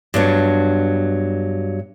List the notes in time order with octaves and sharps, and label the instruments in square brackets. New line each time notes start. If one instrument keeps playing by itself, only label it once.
[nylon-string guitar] G2 F#3 B3 D4